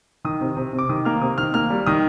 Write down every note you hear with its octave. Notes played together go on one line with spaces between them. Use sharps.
D#3 D#6
C3
C3
C3
D6
D#3 D#6
A#3 F6
C3 D#6
D#3 F6
A#3 F6
G3
D#3 D#6